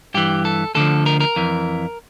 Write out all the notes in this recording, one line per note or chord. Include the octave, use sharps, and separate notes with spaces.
G2 E3 G4
A4
D2 D3 F3 A4
A#4
A#4
F2 E3